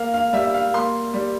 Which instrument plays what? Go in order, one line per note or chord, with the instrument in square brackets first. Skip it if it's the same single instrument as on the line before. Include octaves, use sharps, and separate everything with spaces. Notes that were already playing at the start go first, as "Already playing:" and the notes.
Already playing: [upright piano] A#3 F5
F5
G3 E5
E5
F5
A#3 C6
G3